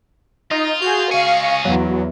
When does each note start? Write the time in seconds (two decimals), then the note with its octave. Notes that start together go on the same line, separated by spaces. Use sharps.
0.51 D#4 F4
0.82 F#4 G#4 G6
1.11 C#2 G#4 F5 C#6
1.65 E2 F#3